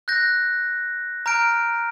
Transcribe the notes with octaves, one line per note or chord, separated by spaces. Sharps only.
F#6 G6 A#6
A#5 F6 G6 D7